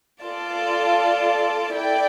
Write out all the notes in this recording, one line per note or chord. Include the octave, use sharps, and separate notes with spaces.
F4 A4 D5 A5
E4 A4 D5 G5